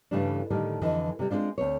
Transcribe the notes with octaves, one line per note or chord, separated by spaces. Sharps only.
G2 C#3 E3 G3 A3 D4
A2 D3 D#3 G3 A3
F2 D3 E3 D#5
C3 G3
G#3 C4 D4 F4
D2 C4 C#5